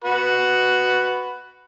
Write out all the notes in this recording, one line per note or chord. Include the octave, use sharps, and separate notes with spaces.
F#4 B4